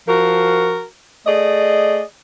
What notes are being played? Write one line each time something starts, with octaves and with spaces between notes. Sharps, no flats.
F3 F#4 A#4
A3 G#4 D5 D#5